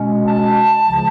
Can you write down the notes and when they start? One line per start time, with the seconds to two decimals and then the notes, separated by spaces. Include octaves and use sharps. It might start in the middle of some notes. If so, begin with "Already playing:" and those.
Already playing: B2 G#3 C#4
0.28 A5
0.83 C#2 C#3 F3